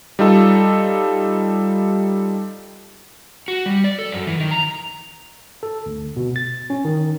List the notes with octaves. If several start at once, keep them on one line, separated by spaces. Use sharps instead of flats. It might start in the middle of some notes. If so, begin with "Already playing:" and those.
G3 D#4 F4 A4
F#4
G3
D5
A4
F#2
E3
D#3
A#5
A4
D2
B2
A6
C#4
D#3